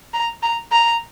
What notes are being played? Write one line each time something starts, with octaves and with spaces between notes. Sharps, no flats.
A#5
A#5
A#5